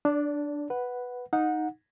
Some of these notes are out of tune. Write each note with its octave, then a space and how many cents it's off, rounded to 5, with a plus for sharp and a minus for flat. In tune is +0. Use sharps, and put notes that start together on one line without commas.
D4 +0 D5 -25
B4 +0 F#5 +0
D#4 +0 F#5 -25